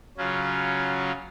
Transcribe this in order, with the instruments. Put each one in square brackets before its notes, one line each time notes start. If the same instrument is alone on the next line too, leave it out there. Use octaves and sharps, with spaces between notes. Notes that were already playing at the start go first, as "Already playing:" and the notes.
[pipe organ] C#3 F#3 C#4 F4